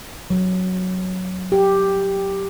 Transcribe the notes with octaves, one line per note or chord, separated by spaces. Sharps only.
F#3
G4